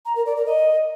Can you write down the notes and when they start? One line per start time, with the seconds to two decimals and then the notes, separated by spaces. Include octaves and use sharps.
0.05 A#5
0.16 A#4
0.26 D5
0.36 A#4
0.46 D#5